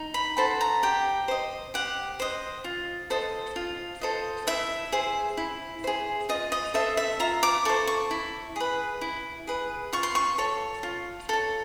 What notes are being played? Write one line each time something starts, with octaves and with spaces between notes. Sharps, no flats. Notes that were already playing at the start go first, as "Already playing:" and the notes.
Already playing: D#4
B5
F#4 A4 C5 B5
A#5
G4 G5
C5 D#5
G4 F#5
C5 D#5
F4
A4 C5 D#5
F4
A4 C5 D#5
E4 E5
G#4 C5
E4
G#4 C5
F4 D#5
D#5
A4 C5 E5
E5
F4 A#5
D6
A4 C5 C#6
C#6
E4
G#4 B4
E4
G#4 B4
F4 C#6
C6
C#6
A4 C#5
F4
A4 C#5